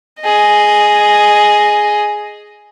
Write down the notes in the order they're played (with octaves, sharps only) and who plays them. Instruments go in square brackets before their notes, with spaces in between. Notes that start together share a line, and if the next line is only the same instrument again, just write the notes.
[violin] G#4 D#5